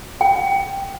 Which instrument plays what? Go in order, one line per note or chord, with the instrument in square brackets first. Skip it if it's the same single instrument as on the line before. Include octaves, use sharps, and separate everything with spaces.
[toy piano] G5